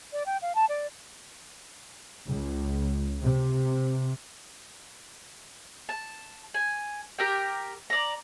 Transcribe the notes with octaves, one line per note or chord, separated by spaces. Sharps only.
D5
G5
F5
A5
D5
C#2
C3
A5
G#5
G4 A#4 G5
D5 A#5